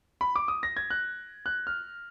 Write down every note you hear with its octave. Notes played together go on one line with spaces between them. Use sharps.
B5
D6
D#6
A#6
G#6
F#6
F#6
F6